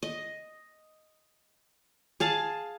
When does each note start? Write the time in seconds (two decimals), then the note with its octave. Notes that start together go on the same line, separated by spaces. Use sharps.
0.02 D#5
2.20 G#4 F5 A5